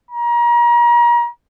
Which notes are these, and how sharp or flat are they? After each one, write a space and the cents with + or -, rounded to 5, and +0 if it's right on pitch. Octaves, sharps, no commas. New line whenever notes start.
A#5 +35